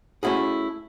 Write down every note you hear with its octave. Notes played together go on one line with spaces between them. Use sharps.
A3 C#4 E4 F#4 G#4